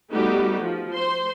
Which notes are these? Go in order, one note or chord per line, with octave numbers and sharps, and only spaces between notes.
G3 A3 B3 D#4 F#4 G4
F3
C5 C6